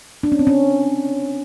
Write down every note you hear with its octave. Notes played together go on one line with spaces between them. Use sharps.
D4
C#4
C4
C#4